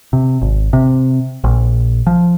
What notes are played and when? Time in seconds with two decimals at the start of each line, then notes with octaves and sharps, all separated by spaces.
0.13 C3
0.42 G#1
0.73 C3
1.44 A#1
2.07 F3